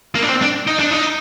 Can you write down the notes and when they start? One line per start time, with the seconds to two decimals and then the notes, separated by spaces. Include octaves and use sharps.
0.15 A#3
0.23 D4
0.29 C4
0.42 D4
0.67 D#4
0.79 D4
0.91 D#4